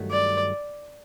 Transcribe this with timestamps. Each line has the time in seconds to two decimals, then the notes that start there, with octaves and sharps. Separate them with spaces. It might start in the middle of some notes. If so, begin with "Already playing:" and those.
Already playing: G2 D#3 F#3 A3
0.11 D5